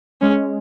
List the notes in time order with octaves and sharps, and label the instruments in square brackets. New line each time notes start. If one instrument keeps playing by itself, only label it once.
[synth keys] G#3 [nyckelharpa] C#4